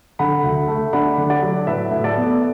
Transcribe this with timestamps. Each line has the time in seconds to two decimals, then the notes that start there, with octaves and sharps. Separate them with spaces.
0.19 D3 F#5 B5
0.44 D2
0.68 A3
0.93 D4 F#5 B5
1.18 D3
1.30 D5 F#5
1.43 F#3
1.67 A2 B4 E5
1.91 A2
2.04 A4 D5
2.16 B3